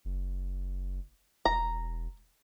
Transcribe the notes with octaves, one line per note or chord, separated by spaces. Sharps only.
F#1
E1 A#5